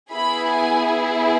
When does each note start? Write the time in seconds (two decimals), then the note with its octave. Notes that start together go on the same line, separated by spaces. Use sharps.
0.12 B3 E4 G#4 B5
0.53 G#5
0.95 G#5